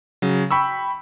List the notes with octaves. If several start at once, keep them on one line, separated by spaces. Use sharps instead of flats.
C#3 F#3
G5 B5 C#6 E6